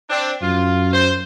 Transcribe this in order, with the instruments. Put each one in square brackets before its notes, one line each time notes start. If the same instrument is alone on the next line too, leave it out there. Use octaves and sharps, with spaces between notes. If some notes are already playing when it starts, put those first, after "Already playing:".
[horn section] C4 D4
[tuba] F#2 [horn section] F4
[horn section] C5